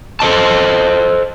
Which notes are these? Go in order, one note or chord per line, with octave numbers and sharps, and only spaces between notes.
A4 C5 D#5 A5